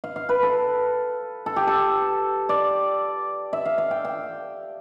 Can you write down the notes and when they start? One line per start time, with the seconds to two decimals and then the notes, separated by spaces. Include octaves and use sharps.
0.04 F5
0.16 F5
0.29 B4
0.43 A4
1.46 A4
1.56 G4
1.67 A4
2.49 D5
3.53 E5
3.65 F5
3.78 F5
3.91 G5
4.05 G5